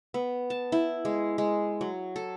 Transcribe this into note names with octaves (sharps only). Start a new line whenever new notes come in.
B3
A5
E4
G#3
G#3
F#3
A4